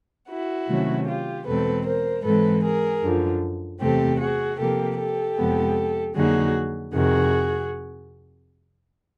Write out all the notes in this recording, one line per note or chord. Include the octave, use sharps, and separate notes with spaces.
E4 F#4
C3 D#3 F#3 A3 C#4
F4 G4
E2 B2 G#3 C4 A4 B4
A#4 C5
G#2 E3 G#3 C4 A4 B4
G#4 A#4
F#2 D3 F3
E2 C3 E3 A3 C4 G4 A4
F#4 G#4
C3 F3 A#3 G4 A4
G4 A4
F2 C3 F3 G#3 B3
F2 D3 F#3 A#3 D#4 F#4 G#4
F2 C3 D#3 F#4 G#4